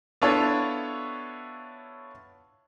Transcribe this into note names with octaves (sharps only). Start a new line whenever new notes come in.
B3 D4 E4 F4 A4 C#5